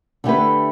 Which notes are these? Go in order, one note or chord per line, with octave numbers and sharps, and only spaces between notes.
D3 A3 E4 G4 B4